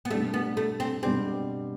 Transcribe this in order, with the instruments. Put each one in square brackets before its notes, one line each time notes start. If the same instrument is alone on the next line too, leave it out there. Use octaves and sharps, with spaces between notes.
[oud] B3
[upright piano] B2 G3 D4 G4 [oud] A3
[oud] B3
A3
C4
[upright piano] B2 G3 D4 G4 [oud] C4